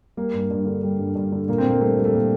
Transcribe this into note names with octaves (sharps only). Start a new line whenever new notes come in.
G3 A#3
G2
G2
D3
G3
G2
G2
D3
A#2 A#3
C4
A#2 A#3
G3 A3 C4
G3
A3
A#2 A#3